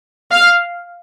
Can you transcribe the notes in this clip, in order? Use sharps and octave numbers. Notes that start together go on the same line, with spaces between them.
F5